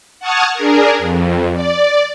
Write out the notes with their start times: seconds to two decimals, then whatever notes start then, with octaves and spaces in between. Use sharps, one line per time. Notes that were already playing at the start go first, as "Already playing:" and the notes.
0.20 F#5 A5 C#6 D#6 F6 G#6
0.54 D4 G#4 A#4
0.99 F2
1.54 D5